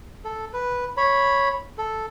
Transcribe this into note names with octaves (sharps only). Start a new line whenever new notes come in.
A4
B4
C#5 B5
A4